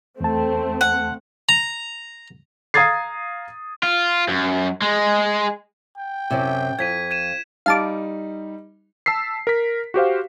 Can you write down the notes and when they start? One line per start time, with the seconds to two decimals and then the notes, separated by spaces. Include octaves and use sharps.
0.20 E2 A3 C4 A5
0.81 F#5
1.49 A#5
2.74 F5 A#5 D#6 G#6 A6 C7
3.83 F4
4.28 F#2
4.82 G#3
5.98 G5
6.31 F#2 C3
6.79 F2 G#6 B6 D#7
7.11 G#6 D#7 E7
7.66 G3 D#4 F5 A5 D6
9.06 A5 E6 B6 C7
9.47 A#4 B6
9.94 F#4 G4 C5 F5